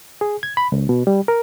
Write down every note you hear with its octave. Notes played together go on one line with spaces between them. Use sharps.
G#4
G#6
B5
C#2
B2
G3
A#4